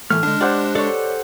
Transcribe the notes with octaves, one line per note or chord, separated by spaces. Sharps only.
A2 E3 A3 F6
D3 G#3 D4
G4 C5 D5 F#5
A4 C#5 D5